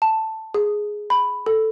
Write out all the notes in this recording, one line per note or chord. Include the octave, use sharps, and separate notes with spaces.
A5
G#4
B5
A4